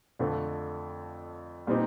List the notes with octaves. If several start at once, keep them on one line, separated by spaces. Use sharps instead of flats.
F2 D3 F3 A3
A#2 G3 C4 D#4